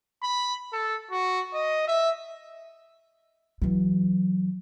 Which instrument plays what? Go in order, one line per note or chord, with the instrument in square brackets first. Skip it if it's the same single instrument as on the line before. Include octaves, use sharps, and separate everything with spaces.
[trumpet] B5
A4
F#4
D#5
E5
[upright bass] E3 F#3